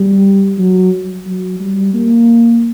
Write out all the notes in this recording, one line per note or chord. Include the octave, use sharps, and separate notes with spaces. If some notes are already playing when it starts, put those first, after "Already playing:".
Already playing: G3
F#3
F#3
G3
A#3